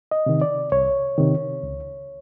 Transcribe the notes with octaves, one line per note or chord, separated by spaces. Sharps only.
D#5
C3 D#3
D5
C2 C#5
C3 D#3
C#2